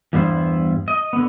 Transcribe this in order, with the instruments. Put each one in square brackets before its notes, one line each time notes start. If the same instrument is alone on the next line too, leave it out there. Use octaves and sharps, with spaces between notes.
[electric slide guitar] E2 G2 G3 B3 E4 C5
D#5
D3 B3